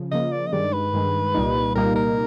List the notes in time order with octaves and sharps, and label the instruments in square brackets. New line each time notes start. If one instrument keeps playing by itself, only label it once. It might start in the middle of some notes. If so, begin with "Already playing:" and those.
Already playing: [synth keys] C#3 F3
[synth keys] C#3 F3 A#3 [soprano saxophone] D#5
[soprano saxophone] D5
D#5
[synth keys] G2 D#3 G#3 [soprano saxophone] D5
[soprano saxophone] B4
[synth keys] G2 D#3 G#3
C2 A#2 G3 A#3 D#4
[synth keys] C2 A#2 G3 A#3 D#4 [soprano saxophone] A#4
[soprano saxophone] A#4